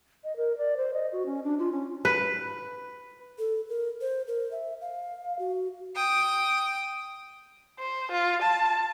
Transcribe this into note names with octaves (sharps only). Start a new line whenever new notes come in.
D#5
A#4
D5
C5
D#5
F#4
C#4
D4
F4
C#4
B4
A4
A#4
C5
A#4
E5
F5
F#4
G5 D#6
C5
F4
A5